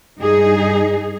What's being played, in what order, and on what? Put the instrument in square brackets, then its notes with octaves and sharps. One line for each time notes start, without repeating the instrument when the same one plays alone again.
[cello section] G2 D#4 G#4